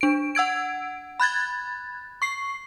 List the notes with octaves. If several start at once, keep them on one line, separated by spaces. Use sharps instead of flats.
D4 D7
F#5 E6 G#6 D7
B5 F#6 G#6 A6
C#6 C7